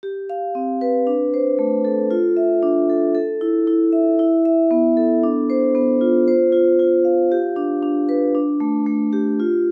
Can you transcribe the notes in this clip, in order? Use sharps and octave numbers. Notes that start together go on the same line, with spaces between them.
G4
F5
C4
B4
D4
C5
A3
A4
F4
E5
D4
A4
A4
E4
E4
E5
E4
E5
B3
A4
D4
C5
B3
F4
C5
F4
F4
F5
G4
D4
D4
B4
D4
A3
A3
G4
F4